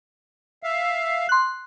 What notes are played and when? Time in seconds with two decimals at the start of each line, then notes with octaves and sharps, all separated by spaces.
0.63 E5 F5
1.29 C6 F#6